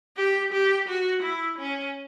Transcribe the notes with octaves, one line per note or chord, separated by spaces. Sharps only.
G4
G4
F#4
E4
C#4